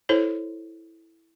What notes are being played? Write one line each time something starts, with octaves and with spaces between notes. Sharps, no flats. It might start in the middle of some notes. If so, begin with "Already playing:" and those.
E4 A4 C5 C#5